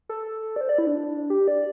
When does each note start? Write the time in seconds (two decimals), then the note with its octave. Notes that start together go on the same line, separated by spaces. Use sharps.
0.09 A4
0.56 D5
0.61 C5
0.69 D5
0.78 E4
0.87 D4
1.30 G4
1.48 D5